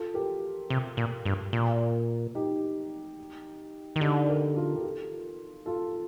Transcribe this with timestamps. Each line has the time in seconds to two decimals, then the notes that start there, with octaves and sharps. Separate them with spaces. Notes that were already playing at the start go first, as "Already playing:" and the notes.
Already playing: F4 A4
0.14 G4 A#4
0.70 C3
0.97 A#2
1.25 G2
1.53 A#2
2.35 D#4 G4
3.96 D#3
4.00 D3 D#4 G4
4.28 G4 A#4
4.55 F4 A4
4.76 G4
4.83 F4 A4
5.66 F4 A4